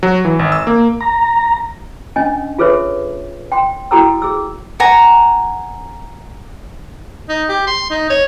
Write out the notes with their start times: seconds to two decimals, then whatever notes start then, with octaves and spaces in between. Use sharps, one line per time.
0.03 F#3
0.25 E3
0.39 G#1
0.52 E6
0.67 A#3
1.01 A#5
2.16 C#4 D4 D#5 G#5
2.58 F4 G#4 A4 B4 C#5 E5
3.52 G5 C6
3.91 E4 F#4 A4 G5 A#5 E6
4.22 G#4 E6
4.80 F#5 G#5 A#5
7.29 D#4
7.49 G4
7.67 C6
7.90 D#4
8.10 C#5